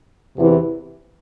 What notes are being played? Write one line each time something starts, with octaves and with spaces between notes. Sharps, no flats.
E2 C3 E3